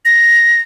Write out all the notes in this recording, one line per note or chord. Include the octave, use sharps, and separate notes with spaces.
A#6